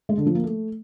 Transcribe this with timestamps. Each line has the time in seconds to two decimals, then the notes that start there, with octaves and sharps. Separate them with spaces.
0.09 G#3
0.18 D3
0.26 F3
0.35 A#3
0.44 A3